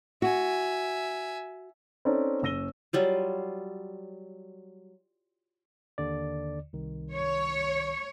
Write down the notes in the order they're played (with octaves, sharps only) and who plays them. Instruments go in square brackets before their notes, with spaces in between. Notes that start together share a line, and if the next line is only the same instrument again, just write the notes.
[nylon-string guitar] F#4 [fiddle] E5 G#5
[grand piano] C4 C#4 D#4 A4 C#5 D5
F#1 C#4 E6 A#6 D#7 G7
[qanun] F#3 G3 F4
[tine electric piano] D#2 D3 D5
C2 D#3
[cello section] C#5